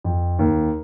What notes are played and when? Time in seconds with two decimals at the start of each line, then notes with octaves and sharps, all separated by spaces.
0.04 F2
0.39 D#2